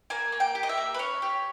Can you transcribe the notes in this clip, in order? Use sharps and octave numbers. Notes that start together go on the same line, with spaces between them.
A#3 G#5
A#3
G5
G4
D#5
E5
A#3
B4
C#4 C#5
G4